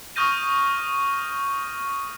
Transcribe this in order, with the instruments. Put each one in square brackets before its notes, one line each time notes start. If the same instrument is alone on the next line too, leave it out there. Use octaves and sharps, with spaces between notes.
[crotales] C#6 D#6 F6 G6 A#6 D#7